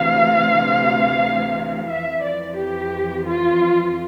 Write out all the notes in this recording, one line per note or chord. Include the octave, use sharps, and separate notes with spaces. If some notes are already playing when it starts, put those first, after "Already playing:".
Already playing: D2 C3 E3 F5
F2 E3 E5
D5
G4
F4